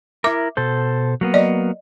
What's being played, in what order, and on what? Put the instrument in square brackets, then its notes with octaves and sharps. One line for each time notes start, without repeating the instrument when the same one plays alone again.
[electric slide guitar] E4 A#4 [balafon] E5 D6
[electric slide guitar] B2 A4 C5
F#3 A#3 B3
[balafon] D5 D#5